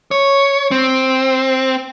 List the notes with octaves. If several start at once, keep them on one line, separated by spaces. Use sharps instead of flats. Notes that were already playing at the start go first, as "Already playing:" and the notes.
C#5
C4